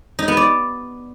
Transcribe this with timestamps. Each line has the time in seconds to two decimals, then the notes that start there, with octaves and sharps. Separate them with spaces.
0.19 D#4
0.28 B3
0.37 D5